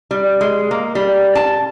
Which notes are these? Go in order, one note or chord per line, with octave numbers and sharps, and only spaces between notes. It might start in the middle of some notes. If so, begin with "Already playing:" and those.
G3
G#3
A#3
G3
A5